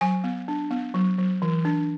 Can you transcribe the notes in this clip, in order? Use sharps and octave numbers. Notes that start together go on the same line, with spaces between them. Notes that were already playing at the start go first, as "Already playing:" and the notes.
F#3 G#5
B3
D4
B3
F#3
F#3
E3
D4